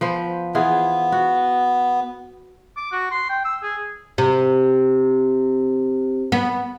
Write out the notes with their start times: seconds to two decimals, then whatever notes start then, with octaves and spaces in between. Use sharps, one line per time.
0.01 F3 B3 C5
0.55 E3 B3 F4 G#4
1.12 F#4
2.77 D6
2.92 F#4
3.11 C6
3.29 G5
3.45 E6
3.63 G#4
4.18 C3
6.32 B3